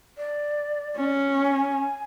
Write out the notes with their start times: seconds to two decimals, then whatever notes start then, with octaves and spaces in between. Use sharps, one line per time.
0.18 D5
0.96 C#4
1.45 G#5